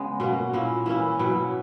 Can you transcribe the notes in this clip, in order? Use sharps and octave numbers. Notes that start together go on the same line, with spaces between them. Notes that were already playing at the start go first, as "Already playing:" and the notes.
Already playing: C#3 G#3 B3
B2 A#3 C#4 F#4
A#2 A#3 C#4 E4
E3 A#3 C#4 E4
B2 F#3 B3 E4